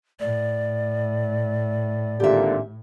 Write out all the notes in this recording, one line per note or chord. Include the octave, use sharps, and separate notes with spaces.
A2 D5
G#1 A#2 D3 G4 E5